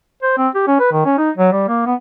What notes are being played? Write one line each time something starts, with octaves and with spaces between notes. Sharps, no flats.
C5
C4
G4
C#4
B4
D#3
C#4
D#4
F#3
G3
A#3
B3